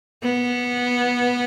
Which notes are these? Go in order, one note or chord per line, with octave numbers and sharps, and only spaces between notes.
B3